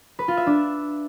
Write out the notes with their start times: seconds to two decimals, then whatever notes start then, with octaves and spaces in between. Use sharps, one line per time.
0.19 B4
0.28 F4
0.37 E5
0.47 D4